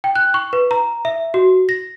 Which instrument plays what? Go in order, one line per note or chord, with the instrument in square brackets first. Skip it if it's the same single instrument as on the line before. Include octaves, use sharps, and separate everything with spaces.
[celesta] G5
F#6
C#6
B4
A#5
E5
F#4
A#6